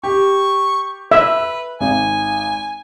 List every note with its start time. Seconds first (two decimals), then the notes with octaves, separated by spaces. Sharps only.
0.03 G4 C#6
1.11 B4 E5
1.81 G#1 G#5